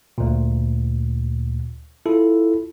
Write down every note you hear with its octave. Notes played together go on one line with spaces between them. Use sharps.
D2 A#2
E4 F4 A4